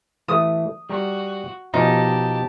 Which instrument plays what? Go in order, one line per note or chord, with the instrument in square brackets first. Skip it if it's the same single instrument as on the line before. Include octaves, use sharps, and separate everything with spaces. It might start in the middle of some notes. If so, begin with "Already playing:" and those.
[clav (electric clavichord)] E3 A3 [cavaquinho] D#6
[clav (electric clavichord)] G3 G4 A#5 [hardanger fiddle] F#4
[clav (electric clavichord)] B2 F3 C#4 [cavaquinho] D#4 [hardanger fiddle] G4 A5